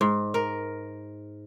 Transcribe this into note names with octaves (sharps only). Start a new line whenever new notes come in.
G#2
A#4